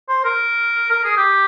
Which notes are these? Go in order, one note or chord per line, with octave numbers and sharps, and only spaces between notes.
C5
A#4
A#4
G#4
G4